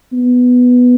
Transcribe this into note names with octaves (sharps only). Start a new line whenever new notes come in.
B3